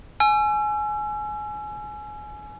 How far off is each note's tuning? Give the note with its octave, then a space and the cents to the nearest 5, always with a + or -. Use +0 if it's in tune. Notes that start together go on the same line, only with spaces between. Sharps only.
G#5 +20 E6 +40